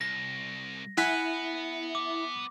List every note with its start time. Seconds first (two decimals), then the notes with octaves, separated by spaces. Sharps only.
0.01 C2 A#6
0.98 B3 E4 F#5 G#5 B5
1.95 D6